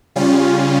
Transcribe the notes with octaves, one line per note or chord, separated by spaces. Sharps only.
C#3 G3 C#4 F4